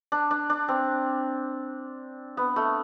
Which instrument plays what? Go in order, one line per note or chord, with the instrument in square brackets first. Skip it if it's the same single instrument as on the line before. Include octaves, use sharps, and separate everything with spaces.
[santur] D4
D4
D4
C4
B3
A3